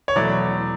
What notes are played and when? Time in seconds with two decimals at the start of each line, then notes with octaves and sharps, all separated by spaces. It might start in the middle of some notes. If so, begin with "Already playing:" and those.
0.08 C#5
0.16 E2 B2 F#3 A3 D5